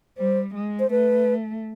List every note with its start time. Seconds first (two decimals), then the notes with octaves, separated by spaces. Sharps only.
0.18 G3 C5
0.54 G#3
0.80 C5
0.91 A3 B4